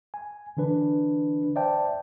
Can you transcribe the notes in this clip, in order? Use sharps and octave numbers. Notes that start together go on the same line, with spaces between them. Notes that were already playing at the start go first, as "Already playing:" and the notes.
G#5
D3 E3 D4 B4
C5 D5 E5 G5 A5